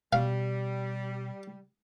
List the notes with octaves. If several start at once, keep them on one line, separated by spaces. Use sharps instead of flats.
B2 G3 F5